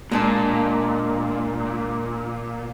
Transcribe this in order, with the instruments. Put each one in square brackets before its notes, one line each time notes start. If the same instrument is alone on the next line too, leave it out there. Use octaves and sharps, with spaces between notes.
[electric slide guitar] A#2 [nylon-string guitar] G#3 D4 A5